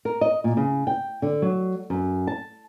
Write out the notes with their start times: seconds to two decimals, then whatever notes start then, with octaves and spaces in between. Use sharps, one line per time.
0.05 A#4
0.21 D#5
0.44 A#2
0.57 C#3
0.87 G5
1.22 D3
1.42 F#3
1.90 F#2
2.27 A5